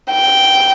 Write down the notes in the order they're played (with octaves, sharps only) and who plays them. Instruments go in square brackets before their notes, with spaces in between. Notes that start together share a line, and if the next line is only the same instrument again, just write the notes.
[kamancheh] G5